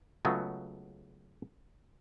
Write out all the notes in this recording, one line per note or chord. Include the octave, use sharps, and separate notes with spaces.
C#2 C#3 F#3 A3 B3